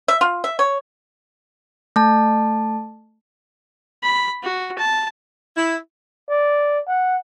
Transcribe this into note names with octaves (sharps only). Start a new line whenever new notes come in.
E5
F4
E5
C#5
A3 A5
B5
F#4
A5
E4
D5
F#5